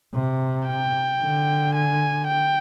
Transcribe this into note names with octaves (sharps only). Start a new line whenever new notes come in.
C3
G5
D3
G#5
G5